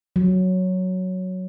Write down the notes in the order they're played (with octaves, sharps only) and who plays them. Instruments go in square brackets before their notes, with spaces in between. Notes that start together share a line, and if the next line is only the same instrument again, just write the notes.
[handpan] F#3